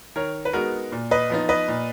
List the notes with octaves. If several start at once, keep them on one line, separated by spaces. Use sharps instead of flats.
D#3 A#4 C#5
B4
G#3 B3 D#4 F#4 A#4
A#2
B4 D#5
F3 B3 D#4
B4 D#5
A#2